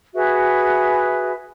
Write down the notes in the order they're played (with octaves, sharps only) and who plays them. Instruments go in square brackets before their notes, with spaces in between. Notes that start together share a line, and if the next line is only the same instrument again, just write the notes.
[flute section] F#4 G#4 B4 E5